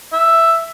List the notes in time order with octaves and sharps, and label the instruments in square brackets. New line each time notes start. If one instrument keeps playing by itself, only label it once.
[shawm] E5